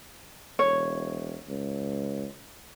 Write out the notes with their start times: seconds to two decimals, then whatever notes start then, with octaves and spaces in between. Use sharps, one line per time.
0.59 E1 C#5
1.48 C#2